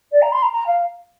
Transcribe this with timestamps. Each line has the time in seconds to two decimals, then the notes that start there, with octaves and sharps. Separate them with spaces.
0.12 D5
0.21 A#5
0.32 C6
0.42 A#5
0.52 A#5
0.66 F5